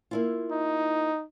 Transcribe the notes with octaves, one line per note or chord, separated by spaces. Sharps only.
A#3 E4 F4
D#4